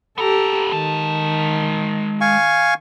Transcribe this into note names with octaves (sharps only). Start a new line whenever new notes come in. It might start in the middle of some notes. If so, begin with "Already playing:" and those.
B3 G4 A4 A#5
D#3 G#3 A5
F5 G#5 C#6